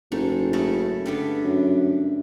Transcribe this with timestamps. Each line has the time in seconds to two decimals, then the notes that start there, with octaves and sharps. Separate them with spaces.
0.12 F#1 G#2 A3
0.53 C#3 A3 E4
1.06 G2 D3 B3
1.44 F#2